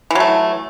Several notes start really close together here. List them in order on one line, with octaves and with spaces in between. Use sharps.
E3 F#3 A3